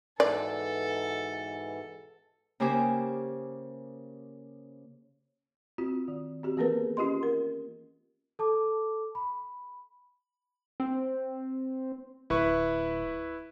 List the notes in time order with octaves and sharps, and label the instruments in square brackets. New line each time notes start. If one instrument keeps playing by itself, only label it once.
[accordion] G#2 B2 E3 [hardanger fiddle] A4 [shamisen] D5
[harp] C#3 A#3 G4 C5 G#5 D6
[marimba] C4 F4 F#4
D#3
C4 F#4 G4
E3 A#3 B3 G#4 A#4 B4
C#4 F4 G4 D#5 C6
A#4
[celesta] A4 A5 D6
B5
[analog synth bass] C4
[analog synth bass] D1 [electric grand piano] E4 B4 C#6